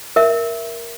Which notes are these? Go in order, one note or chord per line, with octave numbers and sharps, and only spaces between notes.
A#4 E5